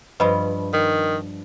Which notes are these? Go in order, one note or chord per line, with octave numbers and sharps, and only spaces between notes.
G2 F3 B4 D#5 B5
D#3